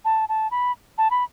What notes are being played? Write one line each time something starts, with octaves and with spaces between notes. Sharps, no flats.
A5
A5
B5
A5
B5